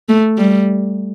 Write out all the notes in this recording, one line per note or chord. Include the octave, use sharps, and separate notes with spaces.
A3
G3